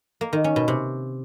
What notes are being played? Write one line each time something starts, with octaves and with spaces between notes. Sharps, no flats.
A#3
D#3
C#4
B2
C3